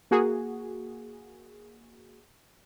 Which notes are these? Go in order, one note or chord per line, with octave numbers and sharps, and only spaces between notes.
A#3 F#4 G#4